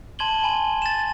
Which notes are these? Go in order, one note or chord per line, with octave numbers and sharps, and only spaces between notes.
A5 C6 G#6 D#7 F#7 G7
G#5 B5
A6 E7